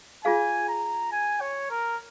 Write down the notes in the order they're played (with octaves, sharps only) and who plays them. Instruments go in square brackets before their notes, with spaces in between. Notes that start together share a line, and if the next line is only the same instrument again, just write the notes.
[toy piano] F4 G#4 F5 [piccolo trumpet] G#5
[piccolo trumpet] A#5
G#5
C#5
A#4